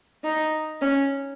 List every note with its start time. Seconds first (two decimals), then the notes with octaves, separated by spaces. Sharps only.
0.24 D#4
0.82 C#4